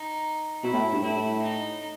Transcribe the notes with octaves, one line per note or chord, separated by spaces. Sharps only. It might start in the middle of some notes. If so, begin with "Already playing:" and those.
Already playing: D#4
B2 E4
A2
G2
A2 E4
D#4